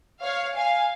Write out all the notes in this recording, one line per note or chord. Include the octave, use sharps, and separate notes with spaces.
C#5 F5
F5 G#5